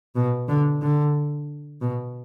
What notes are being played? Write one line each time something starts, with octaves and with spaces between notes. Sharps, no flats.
B2
D3
D3
B2